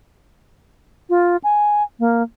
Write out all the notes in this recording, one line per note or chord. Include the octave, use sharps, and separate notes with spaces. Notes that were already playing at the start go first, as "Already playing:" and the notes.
F4
G#5
A#3